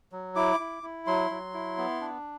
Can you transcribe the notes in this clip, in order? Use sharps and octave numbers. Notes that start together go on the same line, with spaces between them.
F#3
E4 D6
E4
E4
F#3 C6
F#3
E4
B3
D4